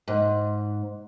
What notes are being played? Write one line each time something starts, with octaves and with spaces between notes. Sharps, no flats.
G#2